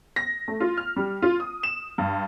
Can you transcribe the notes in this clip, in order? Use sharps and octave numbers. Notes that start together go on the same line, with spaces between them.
A#6
A3
F4
F6
G3
F4
D#6
E7
G2